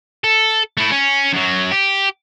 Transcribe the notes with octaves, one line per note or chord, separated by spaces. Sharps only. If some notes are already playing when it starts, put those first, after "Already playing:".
A4
A3 E4
C#4
F#2 F#3
G4